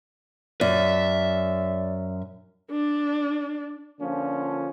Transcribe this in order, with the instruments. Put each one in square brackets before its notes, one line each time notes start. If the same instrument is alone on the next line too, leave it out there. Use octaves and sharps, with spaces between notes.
[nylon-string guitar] F#2 [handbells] D5 [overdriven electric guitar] E5
[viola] D4
[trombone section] D3 F3 A#3 C#4 D4 F4